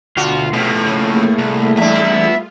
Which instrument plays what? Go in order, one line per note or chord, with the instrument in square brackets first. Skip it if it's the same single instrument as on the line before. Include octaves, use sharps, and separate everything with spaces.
[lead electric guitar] D2 [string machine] B2 [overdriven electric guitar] F4 [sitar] F#4
[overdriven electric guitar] A2 [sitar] C3 [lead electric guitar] F3 B3 [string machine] G#6
[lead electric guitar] C#3 F3 [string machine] A3 A#3 G#4
[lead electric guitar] C2
[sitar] E2 D4 [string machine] G3 A3 G#4 [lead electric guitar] E5
[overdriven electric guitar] B3 E4 [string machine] F4